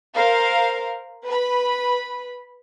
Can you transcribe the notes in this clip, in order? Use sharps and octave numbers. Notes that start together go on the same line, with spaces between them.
A#4 C5 F5
B4 B5